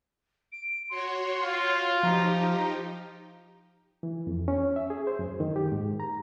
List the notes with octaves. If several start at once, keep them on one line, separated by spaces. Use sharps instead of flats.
D7
F#4 C#5 C6
F4
F3 D#4 G4 A#5
E3
F2
C#4
E5
G#4
C5
F#2
D#3
G4
G#2
A#5